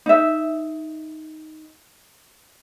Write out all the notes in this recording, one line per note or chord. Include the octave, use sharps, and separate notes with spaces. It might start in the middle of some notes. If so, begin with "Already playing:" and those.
D#4 E5